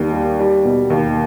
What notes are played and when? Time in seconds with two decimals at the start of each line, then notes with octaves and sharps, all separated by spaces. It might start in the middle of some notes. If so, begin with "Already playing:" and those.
Already playing: D#2 G3
0.13 G3
0.39 G3
0.64 B2
0.90 D#2